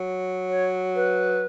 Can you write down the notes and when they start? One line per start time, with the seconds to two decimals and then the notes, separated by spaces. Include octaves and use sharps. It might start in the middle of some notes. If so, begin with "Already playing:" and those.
Already playing: F#3
0.50 C#5
0.95 B4